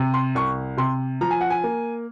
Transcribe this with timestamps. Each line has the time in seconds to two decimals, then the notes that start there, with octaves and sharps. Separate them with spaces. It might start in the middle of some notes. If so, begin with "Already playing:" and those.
Already playing: C3
0.14 C6
0.35 C2 C#6
0.77 C3 C6
1.21 F3 A#5
1.31 G#5
1.41 F#5
1.50 G#5
1.64 A#3